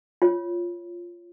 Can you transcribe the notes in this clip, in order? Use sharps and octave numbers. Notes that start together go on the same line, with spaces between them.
F4 C#5